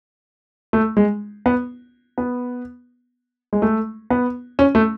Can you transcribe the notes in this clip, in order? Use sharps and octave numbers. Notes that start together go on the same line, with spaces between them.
A3
G#3
B3
B3
G#3
A3
B3
C#4
A3